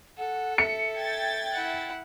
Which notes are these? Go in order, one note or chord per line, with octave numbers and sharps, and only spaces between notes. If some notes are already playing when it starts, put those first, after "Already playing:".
A4 F#5
E5 C#7
G5 G#6 A6
E4 F#5